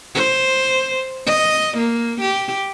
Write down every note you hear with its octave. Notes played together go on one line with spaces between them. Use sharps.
C5
D#5
A#3
G4